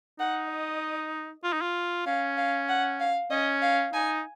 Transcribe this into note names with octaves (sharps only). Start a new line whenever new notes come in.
D#4 F#5
D#5
F4
D#4
F4
C#4 F5
F5
F#5
F5
C#4 D#5
F5
D#4 G#5